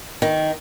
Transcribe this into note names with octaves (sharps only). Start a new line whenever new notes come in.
D#3